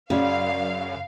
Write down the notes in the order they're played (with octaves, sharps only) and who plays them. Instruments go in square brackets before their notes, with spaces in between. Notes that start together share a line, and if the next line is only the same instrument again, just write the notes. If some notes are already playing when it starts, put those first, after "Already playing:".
[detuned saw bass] F#2 [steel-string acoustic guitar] C#3 [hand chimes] C#4 F#4 D5 [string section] F5